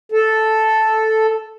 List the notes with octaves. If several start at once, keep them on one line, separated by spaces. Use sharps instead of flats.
A4